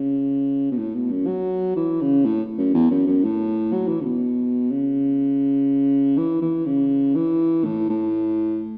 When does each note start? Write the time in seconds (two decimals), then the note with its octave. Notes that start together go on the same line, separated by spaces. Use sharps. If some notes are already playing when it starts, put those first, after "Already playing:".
Already playing: C#3
0.71 B2
0.78 A2
0.95 B2
1.11 F#2
1.27 F#3
1.76 E3
2.01 C#3
2.25 A2
2.58 F#2
2.74 E2
2.91 F#2
3.07 F#2
3.24 A2
3.72 F#3
3.88 E3
4.01 C#3
4.04 B2
4.70 C#3
6.17 E3
6.41 E3
6.66 C#3
7.15 E3
7.64 A2
7.89 A2